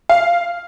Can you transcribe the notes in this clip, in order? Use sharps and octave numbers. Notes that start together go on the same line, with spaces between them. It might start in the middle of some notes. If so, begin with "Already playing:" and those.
F5